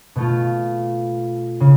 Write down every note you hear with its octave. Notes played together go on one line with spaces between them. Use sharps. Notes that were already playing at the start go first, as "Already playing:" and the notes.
B2 A3 F4
C#3